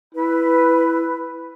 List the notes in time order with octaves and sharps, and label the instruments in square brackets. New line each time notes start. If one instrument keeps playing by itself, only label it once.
[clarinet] E4 [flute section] B4